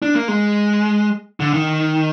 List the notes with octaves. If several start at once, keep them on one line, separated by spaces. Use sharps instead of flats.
D4
A#3
G#3
D3
D#3